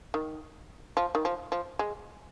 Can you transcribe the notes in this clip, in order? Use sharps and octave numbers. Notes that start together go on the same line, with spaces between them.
D#3
F3
D#3
F3
F3
G#3